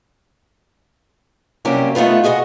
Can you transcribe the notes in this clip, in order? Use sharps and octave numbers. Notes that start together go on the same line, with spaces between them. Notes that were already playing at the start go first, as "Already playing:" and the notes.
C3 F#3 G3 A#3 C#4 G4
A3 B3 D#4 F4 B4
F#4 G#4 D#5 E5 F#5